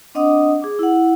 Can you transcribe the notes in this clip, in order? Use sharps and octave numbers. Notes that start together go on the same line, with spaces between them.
C4 D4 D#5 F#5 D6 D#6
G#4 D6
E4 F#5